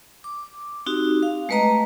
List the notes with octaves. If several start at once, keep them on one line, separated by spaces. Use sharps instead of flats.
D6
C4 D#4 F#4 G4
F5
G#3 A3 B4 D#5 A#5